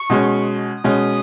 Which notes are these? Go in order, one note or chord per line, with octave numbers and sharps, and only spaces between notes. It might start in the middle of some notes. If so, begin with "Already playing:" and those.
Already playing: C#6
B2 G#3 C#4
B2 G#3 C#4 D#6